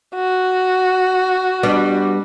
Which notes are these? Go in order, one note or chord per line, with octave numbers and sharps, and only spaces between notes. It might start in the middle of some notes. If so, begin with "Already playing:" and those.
F#4
G3 B3 D4